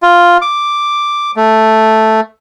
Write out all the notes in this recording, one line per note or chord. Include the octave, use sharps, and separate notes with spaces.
F4
D6
A3